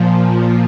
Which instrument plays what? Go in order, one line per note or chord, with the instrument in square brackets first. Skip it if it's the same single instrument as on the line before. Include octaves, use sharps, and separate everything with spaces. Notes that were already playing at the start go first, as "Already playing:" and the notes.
Already playing: [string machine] A#2 F3